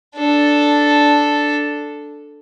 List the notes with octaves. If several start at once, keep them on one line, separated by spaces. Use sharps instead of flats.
D4 A4